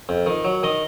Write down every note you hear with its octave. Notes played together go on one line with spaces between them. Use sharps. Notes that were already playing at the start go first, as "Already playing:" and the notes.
F2
D#3
F#3
D#3 D#5